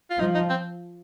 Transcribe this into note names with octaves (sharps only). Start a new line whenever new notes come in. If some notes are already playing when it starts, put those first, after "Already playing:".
F4
F3 D#4
D#4
C4